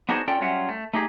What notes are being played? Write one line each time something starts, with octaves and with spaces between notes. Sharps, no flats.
B3 D4 D#4 F#4 G#4 C5
C#4 F4 A4 D5 G5
F#3 G3 C#4 F4 E5 F#5
A3
A3 D#4 G4 G#4